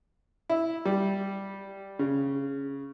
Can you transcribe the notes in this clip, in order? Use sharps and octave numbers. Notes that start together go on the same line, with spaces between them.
E4
G3
C#3